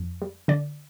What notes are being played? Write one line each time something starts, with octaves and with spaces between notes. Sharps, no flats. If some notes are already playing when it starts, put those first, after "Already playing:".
Already playing: F2
G3
D3 D5